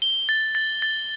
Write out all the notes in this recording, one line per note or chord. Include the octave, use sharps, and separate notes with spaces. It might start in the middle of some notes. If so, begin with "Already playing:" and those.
G7
A6
A6
A6